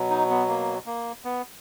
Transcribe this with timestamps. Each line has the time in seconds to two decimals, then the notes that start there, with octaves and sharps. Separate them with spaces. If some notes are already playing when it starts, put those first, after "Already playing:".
Already playing: B2 F#3
0.11 D#4
0.30 B3
0.48 A#3
0.86 A#3
1.24 B3